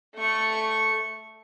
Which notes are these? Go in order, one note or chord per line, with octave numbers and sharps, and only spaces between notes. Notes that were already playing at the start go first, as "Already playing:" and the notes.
A3 C#6